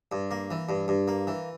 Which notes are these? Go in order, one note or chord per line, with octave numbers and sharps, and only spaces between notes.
G2
A#3
E3
G2
G2
A#3
E3